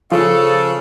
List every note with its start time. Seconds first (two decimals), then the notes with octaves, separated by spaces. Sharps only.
0.11 C#3 F3 A4